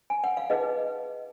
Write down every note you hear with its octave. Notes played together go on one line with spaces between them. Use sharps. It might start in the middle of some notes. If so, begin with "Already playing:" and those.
G#5
F#5
F5
D#4 G#4 B4 D#5